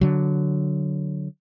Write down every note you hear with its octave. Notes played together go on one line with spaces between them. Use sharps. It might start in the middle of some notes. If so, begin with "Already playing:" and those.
D3 F#3